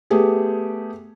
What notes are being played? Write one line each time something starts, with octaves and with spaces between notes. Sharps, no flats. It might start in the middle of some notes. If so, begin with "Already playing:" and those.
A3 B3 G4 G#4